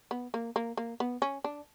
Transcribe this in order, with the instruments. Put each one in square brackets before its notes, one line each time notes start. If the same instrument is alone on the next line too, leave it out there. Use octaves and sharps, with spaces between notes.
[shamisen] B3
A#3
A#3
A#3
B3
C#4
D4